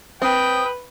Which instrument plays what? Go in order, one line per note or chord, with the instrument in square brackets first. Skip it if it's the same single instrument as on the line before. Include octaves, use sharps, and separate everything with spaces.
[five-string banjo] C4 [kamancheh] B4 [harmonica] G5 [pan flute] D#6